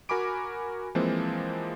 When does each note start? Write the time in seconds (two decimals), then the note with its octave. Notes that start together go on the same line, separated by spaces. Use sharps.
0.09 F#4 A#4 G#5 B5 D6 D7
0.95 E3 F3 G#3 A#3 C4